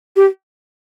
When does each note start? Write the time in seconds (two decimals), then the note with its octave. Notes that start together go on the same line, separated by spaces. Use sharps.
0.16 G4